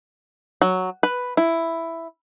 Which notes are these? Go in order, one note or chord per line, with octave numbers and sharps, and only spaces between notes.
F#3
B4
E4